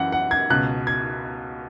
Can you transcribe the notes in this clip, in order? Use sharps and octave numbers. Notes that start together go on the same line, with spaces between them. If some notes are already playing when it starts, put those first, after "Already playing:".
Already playing: F#2 E3 F#5
F#5
G#6
C#2 B2 F#6
G#6